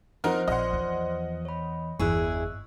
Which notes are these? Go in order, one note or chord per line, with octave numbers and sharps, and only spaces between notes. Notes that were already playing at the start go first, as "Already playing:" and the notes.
F3 C4 D#4 A#4 C5 F#5 F6
A#1 C5 D5 D#5 F#5 C6
E2
C#5 B5
G1 E2 E4 G#4 C#6 E6 F#6